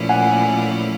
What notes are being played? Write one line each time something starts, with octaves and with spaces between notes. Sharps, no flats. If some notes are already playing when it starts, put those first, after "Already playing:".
Already playing: A#2 F3 A3 C#4 E4
F#5 G#5